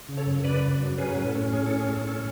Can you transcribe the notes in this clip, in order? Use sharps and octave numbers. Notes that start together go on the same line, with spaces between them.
C#3
A4 C#5
F#2
C#3 B4 D5
F#2
F#3
C#4 G#4 B4
A2 B4
A4
C#4
A2 G#4
A4
C#4
G#4
A2 A4
C#4 A4